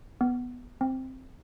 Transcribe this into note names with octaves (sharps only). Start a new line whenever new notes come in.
B3
C4